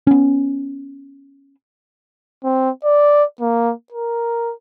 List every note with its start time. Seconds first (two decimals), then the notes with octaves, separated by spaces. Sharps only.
0.07 B3 C#4
2.44 C4
2.84 D5
3.40 A#3
3.92 A#4